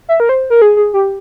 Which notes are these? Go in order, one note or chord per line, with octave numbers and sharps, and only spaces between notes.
E5
A#4
C5
A#4
G#4
G#4
G4